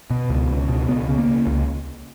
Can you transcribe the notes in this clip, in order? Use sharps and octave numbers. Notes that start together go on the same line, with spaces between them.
B2
C#2
C#2
B2
C#2 B3
C#3
A#3
C#3
C#2